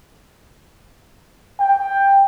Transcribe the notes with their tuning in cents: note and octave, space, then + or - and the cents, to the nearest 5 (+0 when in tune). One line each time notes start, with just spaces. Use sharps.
G5 +10